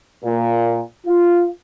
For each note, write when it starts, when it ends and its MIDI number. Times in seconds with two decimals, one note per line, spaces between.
0.24 0.82 46
1.06 1.48 65